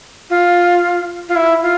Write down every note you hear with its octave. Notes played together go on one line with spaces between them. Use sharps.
F4
F4
E4
F4